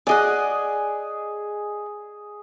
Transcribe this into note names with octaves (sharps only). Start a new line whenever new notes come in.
G#4 D5 D#5 F#5 G#5